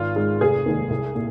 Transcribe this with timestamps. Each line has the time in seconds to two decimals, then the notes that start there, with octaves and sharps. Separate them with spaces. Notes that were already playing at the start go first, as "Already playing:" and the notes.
Already playing: G#1 F4
0.16 G#2 G#3
0.41 F1 G#4
0.66 D#2 D#3 G#3
0.90 C2
1.15 A#2